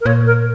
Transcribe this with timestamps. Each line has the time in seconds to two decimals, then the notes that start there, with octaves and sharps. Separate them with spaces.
0.01 A#4
0.06 A#2 C#5
0.26 A#4